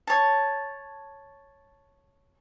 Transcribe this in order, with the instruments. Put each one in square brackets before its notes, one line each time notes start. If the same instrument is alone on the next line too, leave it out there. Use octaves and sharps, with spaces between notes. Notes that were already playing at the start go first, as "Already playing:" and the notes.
[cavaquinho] C#5 A5